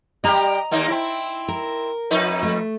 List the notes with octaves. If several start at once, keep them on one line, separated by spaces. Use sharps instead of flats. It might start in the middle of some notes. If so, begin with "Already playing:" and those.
G3 G4 D#5 A#5
D#2 A#3 D#4
C4 E4
A#4
F2 D#4 B4
A3